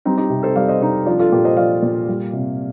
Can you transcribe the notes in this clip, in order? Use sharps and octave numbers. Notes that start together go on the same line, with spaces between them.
G3 C4 D#4
D#4 G4
C3
A4 C5
G3 D5 F5
C5 D#5
C3 D#4 G4
F3 D4 F4
F4 A4
A#2 G4 A#4
C5 D#5
F3 D5 F5
A#2
G3
C3